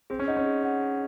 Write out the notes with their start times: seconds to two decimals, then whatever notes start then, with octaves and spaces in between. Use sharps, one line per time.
0.10 C4 G#4
0.19 C#4
0.28 D#4 D#5 F#5
0.37 C#4
0.46 G#4
0.63 D#5 F#5
0.81 G#4